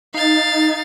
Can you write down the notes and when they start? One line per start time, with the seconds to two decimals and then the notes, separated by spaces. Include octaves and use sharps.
0.14 D#4 F5 A6